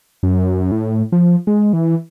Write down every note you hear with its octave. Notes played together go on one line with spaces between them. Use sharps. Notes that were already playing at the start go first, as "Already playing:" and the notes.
F#2
A2
F3
G#3
E3